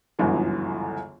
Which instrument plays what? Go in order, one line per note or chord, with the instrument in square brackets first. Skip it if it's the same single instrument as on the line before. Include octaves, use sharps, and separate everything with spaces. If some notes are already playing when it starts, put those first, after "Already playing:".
[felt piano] G1 C#2 F#2 D3 E3